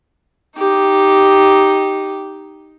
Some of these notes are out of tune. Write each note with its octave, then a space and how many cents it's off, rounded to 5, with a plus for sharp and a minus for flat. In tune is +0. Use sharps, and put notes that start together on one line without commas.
D#4 +0 G4 -5